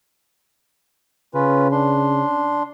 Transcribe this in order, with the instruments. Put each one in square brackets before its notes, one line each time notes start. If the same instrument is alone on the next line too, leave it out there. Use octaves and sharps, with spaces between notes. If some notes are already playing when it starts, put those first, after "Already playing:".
[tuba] C#3 [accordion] C#4 F4 B4
[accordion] D4 C6